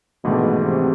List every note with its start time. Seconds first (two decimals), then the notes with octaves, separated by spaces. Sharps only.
0.24 A#1 G#2 B2 E3 A3
0.64 C3